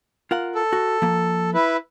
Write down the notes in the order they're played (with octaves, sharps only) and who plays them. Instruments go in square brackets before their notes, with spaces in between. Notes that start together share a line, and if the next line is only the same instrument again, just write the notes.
[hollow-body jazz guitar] F4 A#4 F#5
[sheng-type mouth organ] A4
[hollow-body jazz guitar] F#4
F3 A#3
[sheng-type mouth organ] E4 B4